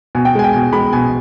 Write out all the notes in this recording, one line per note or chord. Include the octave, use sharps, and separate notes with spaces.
B2 G#5
G5
G#3 G#5
G5
B2 G#5
G#3 B5
B2 G#5